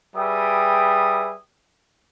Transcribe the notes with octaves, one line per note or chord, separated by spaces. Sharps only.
G3 G#4 B4 E5 G5 D#6